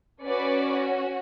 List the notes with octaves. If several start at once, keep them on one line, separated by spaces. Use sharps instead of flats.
C#4 F#4 B4 D5